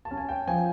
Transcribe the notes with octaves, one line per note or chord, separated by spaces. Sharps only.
A5
C#4
G#5
G5
F3 G#5